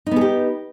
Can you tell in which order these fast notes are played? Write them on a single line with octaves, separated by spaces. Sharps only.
D#4 B3 G#4 G4